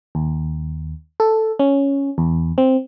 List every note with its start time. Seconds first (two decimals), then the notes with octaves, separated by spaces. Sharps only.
0.15 D#2
1.20 A4
1.59 C#4
2.18 E2
2.58 C4